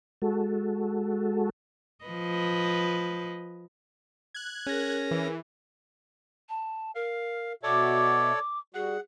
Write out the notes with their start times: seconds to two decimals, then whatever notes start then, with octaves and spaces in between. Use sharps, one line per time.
0.22 G#3 F#4 A4
2.05 F3 B4 D#5
4.35 F#6 G#6
4.66 C#4 G#4 A#4 A#6
5.11 E3
6.49 A5
6.95 A#4 F5
7.63 B2 F#4 A4 C#5 D5 E5 D6
8.74 G3 F#4 G#4 F#5